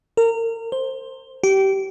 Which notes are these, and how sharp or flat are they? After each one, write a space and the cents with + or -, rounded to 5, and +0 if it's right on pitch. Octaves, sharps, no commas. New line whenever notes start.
A#4 -30
C5 +10
G4 -25